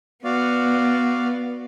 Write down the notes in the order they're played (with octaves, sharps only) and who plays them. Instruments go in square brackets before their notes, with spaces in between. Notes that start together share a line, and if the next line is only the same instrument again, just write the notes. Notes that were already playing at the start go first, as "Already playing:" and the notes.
[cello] B3 [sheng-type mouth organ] F#4 D5 F5